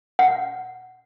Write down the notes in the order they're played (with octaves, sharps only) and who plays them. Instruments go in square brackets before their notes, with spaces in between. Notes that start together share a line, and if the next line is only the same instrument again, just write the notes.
[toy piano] F#5